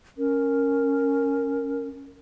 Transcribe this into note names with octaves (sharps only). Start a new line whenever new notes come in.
C#4 A#4